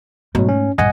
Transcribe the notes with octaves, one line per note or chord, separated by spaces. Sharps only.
G#2 B2 F#3 A3
C#4
A#1 G2 D#5 F#5 G#5